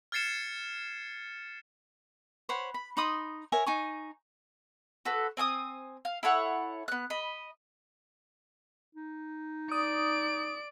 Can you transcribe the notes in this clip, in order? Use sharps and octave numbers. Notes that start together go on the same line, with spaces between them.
F6 G#6 A6 C7 C#7 E7
C5 C#5 F#5 B5
B5
D#4 B5 C6 D#6
A#4 C#5 E5 G#5
D#4 G#5 C#6
F#4 A4 B4
C4 G#5 C#6 D#6
F5
E4 A4 C#5 F#5
B3 F#6
D#5 B5
D#4
D5 D#6 D7